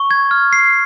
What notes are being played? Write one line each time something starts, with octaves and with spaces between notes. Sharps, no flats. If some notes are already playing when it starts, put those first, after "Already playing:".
Already playing: C#6
G#6
F6
C7